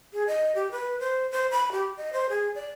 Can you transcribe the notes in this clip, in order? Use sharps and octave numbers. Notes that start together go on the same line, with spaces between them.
G#4
D#5
G4
B4
C5
C5
B5
G4
D#5
C5
G#4
D5